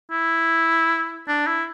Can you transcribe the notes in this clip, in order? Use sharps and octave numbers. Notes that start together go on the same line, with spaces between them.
E4
D4
E4